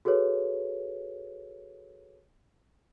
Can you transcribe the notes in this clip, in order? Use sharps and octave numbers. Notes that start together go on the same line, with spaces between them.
F#4 G#4 A4 B4 C#5